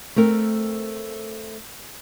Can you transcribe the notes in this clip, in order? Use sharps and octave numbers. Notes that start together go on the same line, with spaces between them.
A3 C4 A#4